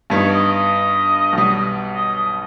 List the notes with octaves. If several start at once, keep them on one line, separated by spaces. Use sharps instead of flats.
G2 G3 B3 D#4 C#5
D#5
D#5
B1 B2 G3
D#5
D#5